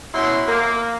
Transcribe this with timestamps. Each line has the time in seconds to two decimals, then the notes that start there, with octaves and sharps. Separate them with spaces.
0.13 B2 C#4 E4 C6
0.46 A#3